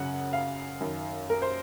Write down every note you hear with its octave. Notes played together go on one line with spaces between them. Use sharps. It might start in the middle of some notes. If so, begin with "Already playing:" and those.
Already playing: F#2 C#3 F#5
F5
F#2 D#3
A#4
C5